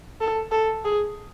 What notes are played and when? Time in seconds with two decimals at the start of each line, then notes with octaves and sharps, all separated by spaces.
0.21 A4
0.52 A4
0.85 G#4